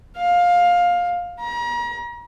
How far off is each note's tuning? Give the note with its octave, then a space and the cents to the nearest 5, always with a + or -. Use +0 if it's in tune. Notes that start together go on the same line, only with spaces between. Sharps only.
F5 +15
A#5 +40